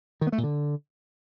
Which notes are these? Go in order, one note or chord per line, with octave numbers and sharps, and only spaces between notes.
D#3
B3
A3
A#2
D3